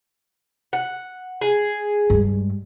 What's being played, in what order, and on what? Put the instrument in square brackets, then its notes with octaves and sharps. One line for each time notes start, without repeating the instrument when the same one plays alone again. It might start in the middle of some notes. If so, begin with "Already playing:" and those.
[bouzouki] F#5
G#4
[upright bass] G2 G#3